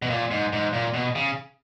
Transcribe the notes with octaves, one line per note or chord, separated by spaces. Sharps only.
B2
A#2
G#2
G#2
A#2
B2
C#3